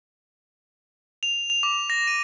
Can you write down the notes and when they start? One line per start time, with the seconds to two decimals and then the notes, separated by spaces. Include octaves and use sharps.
1.23 F7
1.50 F7
1.63 D6
1.90 A#6
2.07 D#7